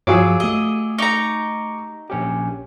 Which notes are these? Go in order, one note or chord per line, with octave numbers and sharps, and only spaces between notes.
G2 F3 F#3 F4 G#4 D6 E6
A3 G4 D#5
D#4 A#5 C#6 D6
A#1 C#4 G4